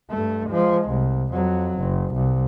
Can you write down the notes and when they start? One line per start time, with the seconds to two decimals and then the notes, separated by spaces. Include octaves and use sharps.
0.10 G2 A3
0.50 F3 G#3
0.89 C2
1.33 F2 F#3
1.79 F#1
2.14 C2